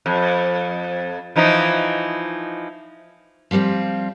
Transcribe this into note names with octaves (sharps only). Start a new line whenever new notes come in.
F2
E3 F3 D#4
F3 G3 B3 C4 F4